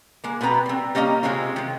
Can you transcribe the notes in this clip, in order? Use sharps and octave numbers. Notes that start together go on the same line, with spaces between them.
G#3 A#3
B2 B3 C4 B4 A#5
G3 C4
G3 A#3 C#4 D#5 A#5
C3 G#3 C4 C#4 F4
D#3 G#3